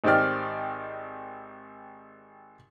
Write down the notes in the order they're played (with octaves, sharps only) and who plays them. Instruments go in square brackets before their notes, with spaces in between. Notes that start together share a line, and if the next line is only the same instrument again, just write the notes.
[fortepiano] G#1 D#3 C4 G4 D5 F6